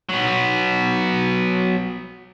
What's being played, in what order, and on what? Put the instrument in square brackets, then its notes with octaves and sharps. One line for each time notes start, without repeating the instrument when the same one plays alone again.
[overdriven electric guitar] F#3 B3